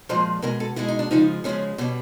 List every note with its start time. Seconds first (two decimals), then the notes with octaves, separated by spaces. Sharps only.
0.09 A#2 F3 G#3 C5
0.42 B2 G#3 A#4
0.60 A4
0.76 B2 G#3 E4
0.88 D#4
0.99 D4
1.11 C#3 F3 G#3 D#4
1.44 C#3 F3 G#3 C#4
1.78 B2 G3 C#4